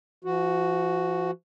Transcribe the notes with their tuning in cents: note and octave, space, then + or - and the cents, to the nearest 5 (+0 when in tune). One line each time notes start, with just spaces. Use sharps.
F3 -35 F#4 +0